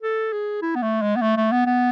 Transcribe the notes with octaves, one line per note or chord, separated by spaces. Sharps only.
A4
G#4
E4
B3
A3
G#3
B3
A3
A3
B3
B3